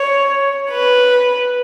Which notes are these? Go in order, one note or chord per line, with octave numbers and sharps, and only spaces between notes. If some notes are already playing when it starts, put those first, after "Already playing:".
Already playing: C#5
B4